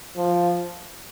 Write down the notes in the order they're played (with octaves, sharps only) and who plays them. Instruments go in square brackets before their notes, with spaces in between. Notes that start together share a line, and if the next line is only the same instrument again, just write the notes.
[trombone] F3